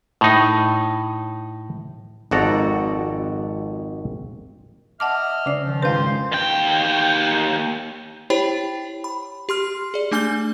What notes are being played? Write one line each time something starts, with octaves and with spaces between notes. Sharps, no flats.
A2 D#4
G#1 F2 F#4 A4 D5 A#5
D#5 E5 F#5 A5 D6 F6
C#3 C#4 D5
D#3 F3
F2 G#2 C#3 B4 C5 F5
D#2 G5
E4 G4 C5 C#5 G5 B5
B5
G4 C6 F6
G#4 D5
A3 D4 G#5 F6 G6 G7